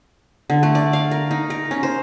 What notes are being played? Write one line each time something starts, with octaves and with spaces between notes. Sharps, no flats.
D3
A3
D5
F5
A#4
D#4
A#4
C#4
C5